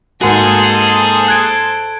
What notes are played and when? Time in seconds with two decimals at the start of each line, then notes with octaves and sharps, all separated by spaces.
0.21 G#2 A#3 F#4 G#4 A4 C5 F#5
1.28 F#6 G#6 D7